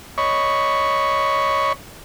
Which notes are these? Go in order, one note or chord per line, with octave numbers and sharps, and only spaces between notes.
C#5 D#5 B5 C#6